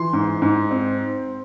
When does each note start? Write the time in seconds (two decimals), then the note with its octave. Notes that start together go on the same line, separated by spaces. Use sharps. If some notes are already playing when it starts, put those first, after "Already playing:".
Already playing: E3 C6
0.13 G#2
0.42 G#2
0.71 C4